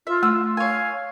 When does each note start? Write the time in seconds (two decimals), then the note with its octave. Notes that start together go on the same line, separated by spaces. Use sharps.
0.07 F4 E5
0.23 A3 E6
0.57 C#5 F5 G#5